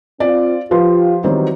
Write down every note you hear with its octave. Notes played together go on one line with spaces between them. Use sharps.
C4 F4 C5 D5
F3 F4 G4 B4 C6
D#3 E3 F#3 G3 C4